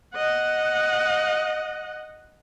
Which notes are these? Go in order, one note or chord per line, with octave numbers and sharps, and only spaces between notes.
D#5 F#5